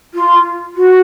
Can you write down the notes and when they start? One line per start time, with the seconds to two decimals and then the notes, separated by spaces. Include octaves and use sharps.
0.14 F4
0.76 F#4